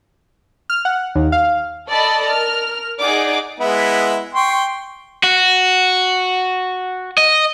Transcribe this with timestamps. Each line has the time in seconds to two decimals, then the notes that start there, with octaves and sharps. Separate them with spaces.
0.70 F6
0.85 F#5
1.15 D#2
1.32 F5
1.88 A4 D5 D#5 A5 B5
2.29 A#4 F6
2.99 D#4 G#4 D5 F#5 D6
3.60 G#3 B3 E4
4.35 G5 C6 C#6
5.23 F#4
7.18 D#5